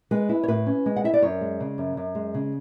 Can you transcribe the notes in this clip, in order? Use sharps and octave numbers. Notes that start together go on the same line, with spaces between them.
G#3 B4
E4
C#5
A2 B4
C#4
G#3
F#5
E4 E5
D5
F#2 C#5
G#3
C#3
F#2
F#2
G#3
C#3